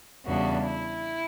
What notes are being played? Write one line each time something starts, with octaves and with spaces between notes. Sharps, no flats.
E2 C#3 G3 B3 D4 F#4
E4